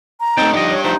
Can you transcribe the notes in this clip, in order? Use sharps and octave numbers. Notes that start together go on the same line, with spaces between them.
A#5
A3 C4 D#4 G5 A5
D3 F3 D4 G4 D#5
C#5
F3 F#3 A3 D#4 C5